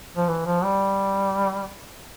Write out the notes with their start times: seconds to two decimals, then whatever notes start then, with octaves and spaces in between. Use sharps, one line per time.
0.17 F3
0.28 E3
0.46 F3
0.63 G3